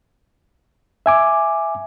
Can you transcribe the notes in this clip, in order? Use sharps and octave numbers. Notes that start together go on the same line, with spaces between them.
E5 G#5 D6